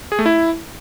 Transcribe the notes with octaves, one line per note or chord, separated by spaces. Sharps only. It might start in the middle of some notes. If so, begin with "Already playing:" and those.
G#4
A3
E4